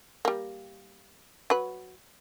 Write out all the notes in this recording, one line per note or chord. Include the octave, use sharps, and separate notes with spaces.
G3 A#3
F#3 B4